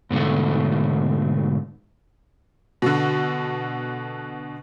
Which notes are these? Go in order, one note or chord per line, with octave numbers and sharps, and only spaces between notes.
G#2 B2 D3 A3
B2 D3